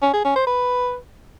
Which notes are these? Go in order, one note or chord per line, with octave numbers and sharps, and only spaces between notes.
C#4
G#4
C#4
C5
B4